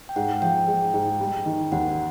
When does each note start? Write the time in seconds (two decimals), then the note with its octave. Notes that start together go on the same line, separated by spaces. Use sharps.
0.09 G5
0.16 G#2 F#5
0.42 F3 G5
0.68 G#3
0.94 G#2
1.20 G3
1.46 D#3
1.72 D#2 F#5